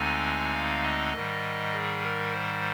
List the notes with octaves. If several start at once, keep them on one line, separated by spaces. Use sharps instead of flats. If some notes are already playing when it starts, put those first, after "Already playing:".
Already playing: D2 D3 G#3 C4 D#4 G#5
F5
D#5
G#2 D#3 G3
G#4
A#4
C5